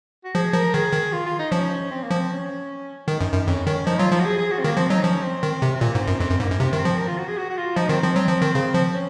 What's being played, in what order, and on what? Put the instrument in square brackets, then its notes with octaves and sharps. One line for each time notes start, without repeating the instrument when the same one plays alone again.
[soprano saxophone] F#4
[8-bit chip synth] F3 [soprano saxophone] G#4
[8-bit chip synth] F3 [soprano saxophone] A#4
[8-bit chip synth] D#3 [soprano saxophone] G#4
[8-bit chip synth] D#3
[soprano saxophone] F4
F4
D#4
[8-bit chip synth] F3 [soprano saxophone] C#4
[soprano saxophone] C4
A#3
[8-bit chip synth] F3
[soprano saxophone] C4
C#4
[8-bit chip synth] D#3 [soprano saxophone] D#4
[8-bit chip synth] F#2
F#2
[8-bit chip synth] F2 [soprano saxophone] C#4
[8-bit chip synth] D#3 [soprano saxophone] C#4
[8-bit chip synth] F3 [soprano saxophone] D#4
[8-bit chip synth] F#3 [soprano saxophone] F4
[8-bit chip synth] F3 [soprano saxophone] F4
[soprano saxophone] F#4
G#4
G#4
F#4
C4
[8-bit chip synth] D#3 [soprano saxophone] A#3
[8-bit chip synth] F3 [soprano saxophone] C4
[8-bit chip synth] F#3 [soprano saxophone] D#4
[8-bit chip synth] F3 [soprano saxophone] C#4
[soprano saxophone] C4
[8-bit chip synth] D#3
C3
[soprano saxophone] C4
[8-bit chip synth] A#2 [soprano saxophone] A#3
[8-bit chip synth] G#2
[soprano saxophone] C4
[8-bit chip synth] F#2
[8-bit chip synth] F2 [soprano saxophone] C4
[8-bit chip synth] F#2
[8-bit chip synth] G#2 [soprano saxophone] A#3
[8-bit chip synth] F#2
[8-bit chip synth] C3 [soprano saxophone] C4
[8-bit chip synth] D#3
[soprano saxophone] C4
[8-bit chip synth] F3
[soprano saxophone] A#4
F4
F#4
G#4
F#4
F#4
F4
[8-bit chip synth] F3 [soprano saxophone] D#4
[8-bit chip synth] D#3 [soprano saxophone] C4
[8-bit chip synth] F3 [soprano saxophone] C4
[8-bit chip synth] F#3
F3
D#3
C#3
F3
[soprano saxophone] C#4